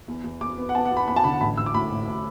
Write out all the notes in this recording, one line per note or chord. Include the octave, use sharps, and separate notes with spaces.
E2
E2
E2 D6
B3
F#5
B3 A5
F#5
E2
B5
E2 B5
A5
D3 B5
F#5
A1 B5
A1 E6
D6
A2 B5
A2
A2